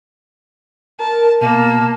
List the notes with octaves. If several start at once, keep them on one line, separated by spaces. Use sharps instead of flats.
A#4 A5
B2 A#3 A5